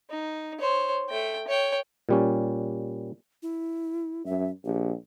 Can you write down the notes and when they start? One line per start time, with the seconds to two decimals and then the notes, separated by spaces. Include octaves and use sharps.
0.10 D#4
0.59 C5 C#5
1.09 A3 G5
1.48 C#5 G5
2.09 A#2 G3 C#4
3.43 E4
4.26 F#2 E5
4.64 A#1 G4